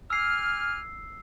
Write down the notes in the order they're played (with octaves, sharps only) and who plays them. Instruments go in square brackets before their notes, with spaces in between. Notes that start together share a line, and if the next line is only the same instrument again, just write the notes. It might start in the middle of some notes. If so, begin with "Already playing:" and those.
[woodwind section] G#5 D6 F6 [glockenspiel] E6 C7